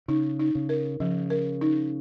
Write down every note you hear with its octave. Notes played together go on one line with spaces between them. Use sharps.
C#3 D#4
D#4
C#3
A#4
C#3 F3
A#4
D#4